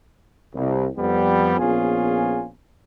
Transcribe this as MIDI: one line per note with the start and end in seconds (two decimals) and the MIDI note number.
0.55 0.86 36
0.97 1.56 41
0.97 1.56 55
0.97 1.56 59
1.59 2.47 34
1.59 2.47 59
1.59 2.47 61
1.59 2.47 65
1.59 2.47 68
1.59 2.47 80